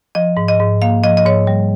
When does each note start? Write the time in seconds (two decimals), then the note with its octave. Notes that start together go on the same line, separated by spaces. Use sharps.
0.15 F3 D#5
0.37 G#2
0.48 D#5
0.60 G#2
0.82 A#3 F5
1.04 F3 D#5
1.17 D#5
1.25 G#2 C#5
1.47 G3